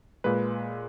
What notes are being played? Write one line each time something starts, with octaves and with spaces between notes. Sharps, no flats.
A#2 G#3 B4